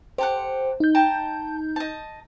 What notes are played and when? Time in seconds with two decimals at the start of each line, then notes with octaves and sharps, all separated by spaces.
0.18 G4 A4 C5 F#5
0.80 D#4 G6
0.95 G5 A5 A#5
1.76 D#5 A5